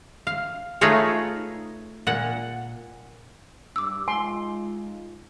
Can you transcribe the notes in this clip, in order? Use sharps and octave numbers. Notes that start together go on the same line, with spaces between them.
F5
A3 D#4 F4 G#4 B4 C#5
A#2 F#5
G2 D6 E6
G#3 D#4 F4 G#5 C6